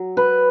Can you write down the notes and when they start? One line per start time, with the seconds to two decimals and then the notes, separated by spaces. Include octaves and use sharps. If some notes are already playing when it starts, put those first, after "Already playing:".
Already playing: F#3
0.17 B4